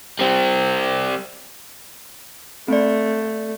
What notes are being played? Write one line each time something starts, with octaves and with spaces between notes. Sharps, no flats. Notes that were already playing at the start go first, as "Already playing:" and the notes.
G3 C4
A3 C4 D5